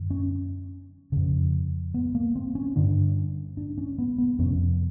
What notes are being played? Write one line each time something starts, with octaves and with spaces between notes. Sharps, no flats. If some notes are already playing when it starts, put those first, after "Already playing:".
Already playing: F#2 D3
C#4
F2 C#3
B3
A#3
C4
C#4
G2 D3 D4
D4
C#4
B3
B3
F2 C3 C#4